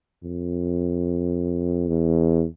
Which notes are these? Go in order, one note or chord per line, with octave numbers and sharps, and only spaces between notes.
F2
E2